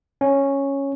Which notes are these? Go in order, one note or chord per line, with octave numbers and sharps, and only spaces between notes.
C#4